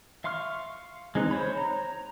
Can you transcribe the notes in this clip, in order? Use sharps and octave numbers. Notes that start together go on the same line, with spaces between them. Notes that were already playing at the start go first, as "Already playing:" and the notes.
E5 F5 C6 C#6 F6
G#3 C4 D#4 B4
C5 C#5 B5
A#5